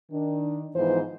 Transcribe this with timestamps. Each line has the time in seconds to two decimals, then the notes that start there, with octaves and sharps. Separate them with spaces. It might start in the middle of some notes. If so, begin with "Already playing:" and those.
0.11 D#3 D4
0.76 G#2 E3 F3 B3 C5